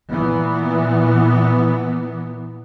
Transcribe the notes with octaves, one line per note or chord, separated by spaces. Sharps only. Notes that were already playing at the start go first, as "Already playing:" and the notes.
A#2 E3 B3